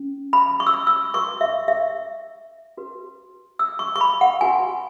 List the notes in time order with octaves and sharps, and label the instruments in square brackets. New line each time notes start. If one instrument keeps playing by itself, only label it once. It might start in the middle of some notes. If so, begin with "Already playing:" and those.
Already playing: [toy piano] C#4
B5
C#6
E6
C#6
E6
F#4 B4 C#6
E5
E5
F#4 B4
E6
C#6
C#6
B5
F#5
F#4 B4 G#5